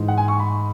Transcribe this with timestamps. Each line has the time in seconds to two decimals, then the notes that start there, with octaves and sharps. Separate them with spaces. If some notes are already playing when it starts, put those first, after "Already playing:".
Already playing: G#2 E3
0.08 F#5
0.18 G#5
0.28 C#6
0.39 B5